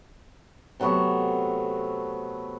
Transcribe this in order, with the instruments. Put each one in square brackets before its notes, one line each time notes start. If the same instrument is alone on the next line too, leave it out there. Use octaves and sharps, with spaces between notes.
[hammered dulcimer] C3 F#3 A3 B3